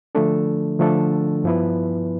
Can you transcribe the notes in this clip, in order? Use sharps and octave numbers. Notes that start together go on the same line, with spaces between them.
D3 F3 A3 D4 A4
D3 F3 A3 D4 A4
G2 F3 B3 E4 B4